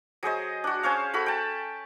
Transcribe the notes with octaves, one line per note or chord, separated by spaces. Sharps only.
F#3 G#4 C5 D#5
D4 F#4
C#4 C5 C#5 F5
F#4 A4 B5
G5 A5